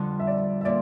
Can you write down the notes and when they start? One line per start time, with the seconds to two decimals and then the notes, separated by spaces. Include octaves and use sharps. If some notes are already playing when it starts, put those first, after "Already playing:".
Already playing: F2 D3 G3
0.20 E5
0.27 D5
0.35 E5
0.61 E5
0.65 A#2 D5